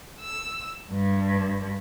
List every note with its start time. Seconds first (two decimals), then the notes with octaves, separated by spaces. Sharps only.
0.20 E6
0.92 G2